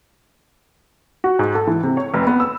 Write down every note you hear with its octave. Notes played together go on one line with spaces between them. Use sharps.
F#4
G#2
A4
E3
C3
C#5
F1
B3
E6